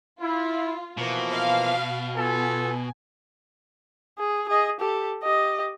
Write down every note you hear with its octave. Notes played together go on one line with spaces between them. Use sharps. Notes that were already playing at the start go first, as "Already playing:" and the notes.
E4 F4
B2 E3 F3 A#3
F5
B3 F4 A4 G#5
G#4
G#4 D#5
G4 A4
G4 D#5